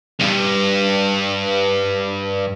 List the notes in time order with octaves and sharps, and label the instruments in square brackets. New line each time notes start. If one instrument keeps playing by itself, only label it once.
[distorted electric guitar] C2 G2